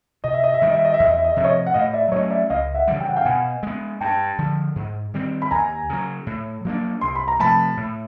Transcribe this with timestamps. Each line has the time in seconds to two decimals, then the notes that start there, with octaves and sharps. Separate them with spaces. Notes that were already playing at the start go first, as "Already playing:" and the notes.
0.24 C3 D#5
0.34 E5
0.44 D#5
0.54 E5
0.62 D#3 G3 D#5
0.74 E5
0.85 D#5
0.94 E5
1.00 E2 D#5
1.14 E5
1.24 D#5
1.34 C3 F3 E5
1.44 C#5 D#5
1.67 F#5
1.74 A2 D#5 F5
1.93 D5 E5
2.12 F#3 A3 C#4 C#5 D#5
2.31 D5 E5
2.50 C#2 D#5 F5
2.75 E5 F#5
2.88 C#3 E3 G3
3.00 G5
3.09 F#5
3.16 F5 G5
3.25 B2 F#5 G#5
3.63 G#3 B3
4.01 G2 G5 A5
4.38 D3 F3
4.76 G#2
5.14 D#3 G3 C4
5.42 B5
5.51 D#2 G#5 A#5
5.90 C#3 F#3
6.27 A2
6.65 F#3 A#3 D4
7.01 C2 C6
7.15 B5
7.28 A#5
7.39 C3 F3 A3 A5 B5
7.77 A2